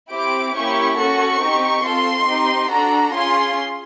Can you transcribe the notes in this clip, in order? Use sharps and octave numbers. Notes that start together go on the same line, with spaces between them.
C4 E4 G4 D6
A#3 C#4 E4 G4 C#6
C#4 F#4 A4 C#6
C4 D#4 G4
C4 F4 A4 C6
C4 D#4 G4
D4 F#4 A4 A#5
C#4 F4 G#4 C6